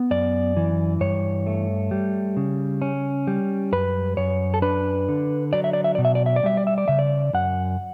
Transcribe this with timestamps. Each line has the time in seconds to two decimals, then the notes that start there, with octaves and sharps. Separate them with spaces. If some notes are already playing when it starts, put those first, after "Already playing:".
Already playing: B3
0.11 F#2 D5
0.57 E3
1.01 G2 C#5
1.47 A3
1.91 G3
2.37 C#3
2.82 C#4
3.27 G3
3.72 F#2 B4
4.17 F#2 C#5
4.54 A4
4.62 D4 B4
5.09 D3
5.53 F#3 D5
5.64 E5
5.73 D5
5.84 E5
5.95 B2 D5
6.05 E5
6.15 D5
6.26 E5
6.36 D5
6.44 G3 E5
6.57 D5
6.67 E5
6.78 D5
6.88 C#3 E5
6.99 D5
7.33 F#2 F#5